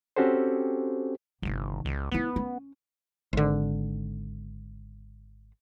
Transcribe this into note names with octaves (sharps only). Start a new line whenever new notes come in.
C4 C#4 F#4 G4 A4 C5
G1 C3 D#3
C#2
F3 B3 E4
C#4
G#1 D3